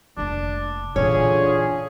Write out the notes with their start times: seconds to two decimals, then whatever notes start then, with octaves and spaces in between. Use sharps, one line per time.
0.17 F1 A#3 D4
0.96 A#2 D3 E3 C#4 F4 G#4 C#5